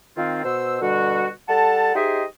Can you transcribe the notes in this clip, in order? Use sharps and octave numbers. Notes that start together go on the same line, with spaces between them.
D#3 C4 F4
B2 C5 E6
B2 D3 G3 F#4
G3 A4 F#5 A5
D#4 G4 G#4 C5 D#5 E5